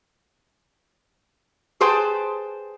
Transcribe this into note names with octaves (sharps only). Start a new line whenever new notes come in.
G#4 B4 C5 G5 A5